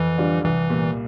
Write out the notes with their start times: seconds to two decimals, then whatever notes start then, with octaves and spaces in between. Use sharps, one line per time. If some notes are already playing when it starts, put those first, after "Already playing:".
Already playing: F2 E3
0.18 D3 G3 D4 F4
0.44 C2 E3
0.70 A#2 G3